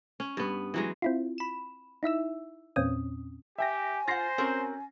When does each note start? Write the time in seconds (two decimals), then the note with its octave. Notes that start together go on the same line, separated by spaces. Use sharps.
0.20 C#4
0.37 G2 B3
0.74 E3 F#3 G#3
1.02 C4 E4 F4
1.38 B5 E7
2.03 D#4 E4 E5 E6
2.76 E2 A#2 C4 C#4 D#6
3.58 G4 E5 G5 G#5 A#6
4.08 F4 C5 F#5 A6 A#6 C7
4.38 C4 C#4 F#4 A#4